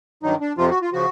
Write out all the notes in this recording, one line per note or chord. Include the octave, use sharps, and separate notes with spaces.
G2 D#3 F#3 D#4
D4
F2 C3 F3 F4
F#4
F4
C#3 F3 F#4